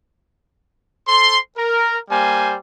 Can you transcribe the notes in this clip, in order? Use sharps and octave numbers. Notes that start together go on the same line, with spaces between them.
A4 C5 C6
A#4
G3 A#3 G4 C5 G#5